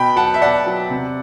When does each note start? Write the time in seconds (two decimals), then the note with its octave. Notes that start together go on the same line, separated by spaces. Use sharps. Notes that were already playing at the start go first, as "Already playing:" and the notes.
Already playing: B2 G5 B5
0.16 F#3 F#5 A5
0.34 E5
0.41 B2 D5 F#5
0.66 F#3
0.90 C3